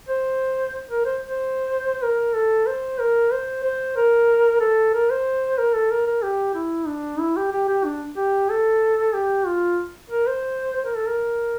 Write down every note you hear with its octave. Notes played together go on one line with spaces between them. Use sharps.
C5
A#4
C5
C5
A#4
A4
C5
A#4
C5
C5
A#4
A4
A#4
C5
A#4
A4
A#4
A#4
G4
E4
D4
E4
G4
G4
G4
D4
G4
A4
G4
F4
A#4
C5
C5
A#4
A4
A#4